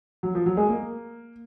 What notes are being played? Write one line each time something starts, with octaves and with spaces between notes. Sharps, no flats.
F#3
F3
F#3
G#3
A#3